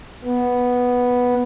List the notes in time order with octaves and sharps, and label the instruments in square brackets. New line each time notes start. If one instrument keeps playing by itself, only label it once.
[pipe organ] B3